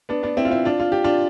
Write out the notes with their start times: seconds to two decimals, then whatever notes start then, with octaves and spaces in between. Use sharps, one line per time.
0.09 B3 D4
0.23 B3 D4
0.37 C4 E4
0.45 F4
0.51 C4 E4
0.65 D4 F4
0.80 F4
0.92 G4
1.04 D4 F4